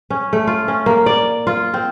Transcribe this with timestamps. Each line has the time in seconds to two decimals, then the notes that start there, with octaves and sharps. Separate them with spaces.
0.10 C#4
0.33 A3
0.47 F4
0.68 C#4
0.86 A#3
1.06 D5
1.47 F4
1.74 C4